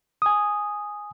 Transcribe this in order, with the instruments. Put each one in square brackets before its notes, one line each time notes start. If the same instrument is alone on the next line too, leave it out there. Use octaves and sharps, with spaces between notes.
[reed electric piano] G#5 D#6